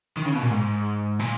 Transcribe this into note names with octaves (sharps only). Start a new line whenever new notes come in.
D#3
C#3
B2
A#2
G#2
A#2